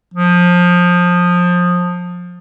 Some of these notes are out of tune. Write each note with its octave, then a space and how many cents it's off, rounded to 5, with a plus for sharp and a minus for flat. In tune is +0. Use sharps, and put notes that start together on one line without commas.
F3 +20